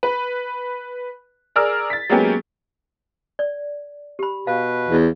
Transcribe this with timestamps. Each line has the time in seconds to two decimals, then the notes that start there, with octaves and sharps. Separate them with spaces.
0.03 B4
1.56 G#4 A#4 D5 E6 F6
1.90 A6 B6
2.09 F#3 G#3 A#3 B3 C#4 G4
3.39 D5
4.19 G4 B5
4.47 B2 B4 F5
4.88 E2